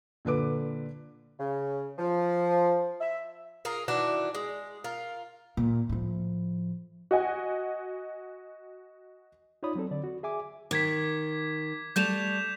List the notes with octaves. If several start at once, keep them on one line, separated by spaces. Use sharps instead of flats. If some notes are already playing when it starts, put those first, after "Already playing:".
A#2 D3 B4 D6
C#3
F3
E5
F4 G#4 A#4
D#3 E3 D4 F#4
G#3
F4 A#4
A#2
A2 F3
F#4 D#5 G#5
D#4 F4 C#5 D5 B5 D#6
F#3 C4 A4
D3 D5
F#4
G#4 E5 G#5 D6
D#3 D6 G#6 B6
G3 A3 G6 E7 F7